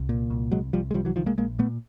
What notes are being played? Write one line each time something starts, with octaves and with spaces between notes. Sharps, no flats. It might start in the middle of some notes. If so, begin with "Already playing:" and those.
Already playing: C2
A#2
C2
C2 F#3 G#3
C2 F3 G3
G#3
C2 F3 G3
E3 F#3
C2 D#3 F3
G#3 A#3
A#1 G#3 A#3
A#2 A3 B3